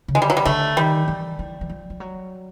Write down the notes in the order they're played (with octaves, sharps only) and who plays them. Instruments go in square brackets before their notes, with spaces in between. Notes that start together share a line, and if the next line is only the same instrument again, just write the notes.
[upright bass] C#3
[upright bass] D3 [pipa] G#3
[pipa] G3
F#3
G3
[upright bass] D3 [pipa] A3
[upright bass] D#3 [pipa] G3
[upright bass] E3
E3
E3
F3
F3
F#3